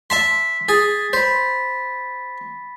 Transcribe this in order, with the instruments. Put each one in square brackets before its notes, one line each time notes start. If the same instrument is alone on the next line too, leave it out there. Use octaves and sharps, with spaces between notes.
[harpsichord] E5 A5 C6 [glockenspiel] B6
[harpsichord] G#4 [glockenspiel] A6
[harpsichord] C5 [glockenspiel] B5 B6